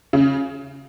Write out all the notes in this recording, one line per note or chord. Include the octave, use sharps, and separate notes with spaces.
C#3